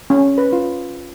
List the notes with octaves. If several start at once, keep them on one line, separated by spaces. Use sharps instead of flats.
C#4
B4
F4